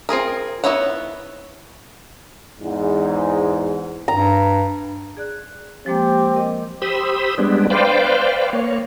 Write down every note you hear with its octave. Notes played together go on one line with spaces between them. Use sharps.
C4 F4 G#4 A#4
B3 D#4 E4 C#5 F#5
E2 G#2
G2 A#5
G#4 D5 F#6
F3 G#3 A#3 C4 G4
A#4 D#5
G4 C5 B5 D#6 E6
G3 G#3 B3 D4
B4 C5 D5 F5 G5
A#3 C#5